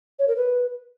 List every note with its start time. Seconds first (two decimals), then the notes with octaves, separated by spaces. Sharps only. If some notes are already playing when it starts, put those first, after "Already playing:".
0.19 C#5
0.28 A#4
0.36 B4